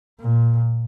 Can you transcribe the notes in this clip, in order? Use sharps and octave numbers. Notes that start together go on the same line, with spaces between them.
A#2